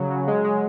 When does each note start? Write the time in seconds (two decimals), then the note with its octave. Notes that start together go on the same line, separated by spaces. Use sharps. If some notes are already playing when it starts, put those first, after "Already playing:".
Already playing: C#3 F#3
0.11 F#3
0.28 G#3
0.44 G#3